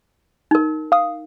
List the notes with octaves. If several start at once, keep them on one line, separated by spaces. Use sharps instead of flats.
D#4 A#4
F5 D#6